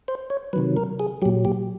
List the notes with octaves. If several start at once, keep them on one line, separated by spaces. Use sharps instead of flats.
C5
C#5
C3 D#3 F#3 B4
A#4
G#4
A#2 F#3 G4
G4